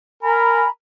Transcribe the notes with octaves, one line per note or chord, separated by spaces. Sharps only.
A#4 G#5 A#5 B5